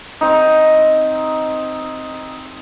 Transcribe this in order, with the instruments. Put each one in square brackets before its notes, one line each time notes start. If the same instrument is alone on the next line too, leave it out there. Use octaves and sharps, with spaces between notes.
[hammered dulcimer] C4 D#4